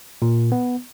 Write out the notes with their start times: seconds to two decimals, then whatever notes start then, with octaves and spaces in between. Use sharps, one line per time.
0.22 A#2
0.52 B3